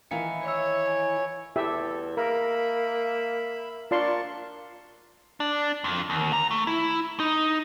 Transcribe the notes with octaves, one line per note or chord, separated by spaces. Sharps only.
D#3 E3 F5 C#7
C#5 E5 E6
G#5
E2 E4 G4 A4 E5
A#3 A#4 E5 B5
D4 F4 A#4 D5 A5 C6 C#6
D4
F2
D#2
A#5
A3
E4
D#4